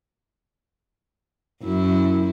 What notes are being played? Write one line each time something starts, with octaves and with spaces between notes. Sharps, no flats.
F#2 E4